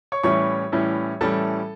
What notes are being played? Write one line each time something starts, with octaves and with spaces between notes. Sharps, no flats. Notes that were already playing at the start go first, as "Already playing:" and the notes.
C#5 C#6
A2 E3 G3 C#4 E4 C#5 C#6
A2 E3 G3 C#4 E4
A2 E3 G3 C#4 E4 A4 A5